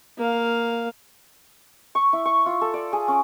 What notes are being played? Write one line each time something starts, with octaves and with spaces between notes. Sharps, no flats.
A#3 F5
C#6
E4
C#6
F4
A4
D5
G#4
C#4